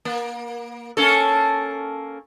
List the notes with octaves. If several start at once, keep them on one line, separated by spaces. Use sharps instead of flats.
A#3
A#3 C#4 A4